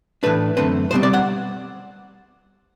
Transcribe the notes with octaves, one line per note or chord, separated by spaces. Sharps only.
A2 E3 A3 D4 B4
F#2 D3 A3 C4 B4
C2 B2 G3 C4 C5
D5
F#5